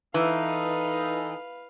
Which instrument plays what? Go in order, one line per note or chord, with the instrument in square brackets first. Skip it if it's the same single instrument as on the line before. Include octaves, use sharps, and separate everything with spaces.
[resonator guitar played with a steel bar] E3 [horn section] D#4 A4 [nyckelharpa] B4 F5